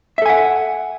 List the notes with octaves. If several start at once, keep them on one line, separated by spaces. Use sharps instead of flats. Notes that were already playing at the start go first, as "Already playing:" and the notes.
A4 E5 F#5 G#5